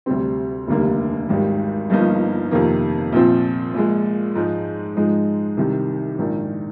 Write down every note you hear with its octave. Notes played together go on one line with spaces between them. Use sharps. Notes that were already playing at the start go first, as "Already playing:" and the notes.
D2 C3 G3 C4
F1 D#2 D3 G3 A#3
G#1 G#2 D#3 G3
G1 G2 F3 A#3 D#4
F2 C3 D#3 A#3
A#1 A#2 F3 C4
A#1 A#2 G#3
G#2 F3 G#3 D#4
G#2 F3 G#3 D#4
C2 C3 D#3
A#1 G#2 D#3 A#3 D4